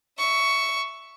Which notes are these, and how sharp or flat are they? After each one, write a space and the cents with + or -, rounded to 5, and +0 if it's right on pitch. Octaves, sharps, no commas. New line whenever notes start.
E5 +0 C#6 +10